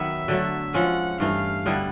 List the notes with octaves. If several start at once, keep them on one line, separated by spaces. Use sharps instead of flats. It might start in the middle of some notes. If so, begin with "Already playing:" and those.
Already playing: D#3 F#3 B3 E5
D3 F#3 A3
F3 G#3 C#4 F#5
G2 E3 A3 F5
D3 G3 B3 E4